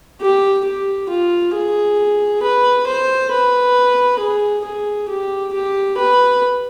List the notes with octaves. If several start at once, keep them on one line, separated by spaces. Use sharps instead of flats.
G4
G4
F4
G#4
B4
C5
B4
G#4
G#4
G4
G4
B4